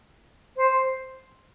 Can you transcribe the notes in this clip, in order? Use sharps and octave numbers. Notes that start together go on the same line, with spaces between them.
C5